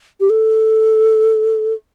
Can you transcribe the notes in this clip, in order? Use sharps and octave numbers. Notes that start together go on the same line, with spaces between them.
G4
A4